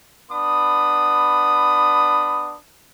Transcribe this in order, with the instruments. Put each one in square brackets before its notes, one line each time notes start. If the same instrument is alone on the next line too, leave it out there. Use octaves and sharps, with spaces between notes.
[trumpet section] B3 D4 B5 D#6